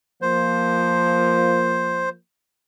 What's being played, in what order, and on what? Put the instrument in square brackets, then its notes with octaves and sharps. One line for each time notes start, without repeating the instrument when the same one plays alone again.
[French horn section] F3 A#3 [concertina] C5